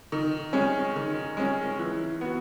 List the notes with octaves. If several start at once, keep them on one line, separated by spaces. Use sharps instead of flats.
D#3
G#3 C#4
D#3
G#3 C#4
E3
B3 F#4